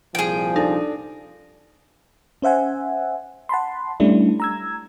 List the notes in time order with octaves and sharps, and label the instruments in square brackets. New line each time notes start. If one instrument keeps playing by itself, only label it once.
[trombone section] C2 A#2 F3 [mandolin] G#4 G5
[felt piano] D4 A4 [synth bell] D#4
[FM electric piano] C#4 C5 E5 F#5 G#5
F#5 A5 B5 C6
G3 A3 C#4 D4 E4
A#5 E6 G#6